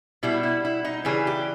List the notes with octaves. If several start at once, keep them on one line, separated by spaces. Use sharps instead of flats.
B2 G3 E4
E4
E4
D#4
C#3 E3 G3 G#4
G4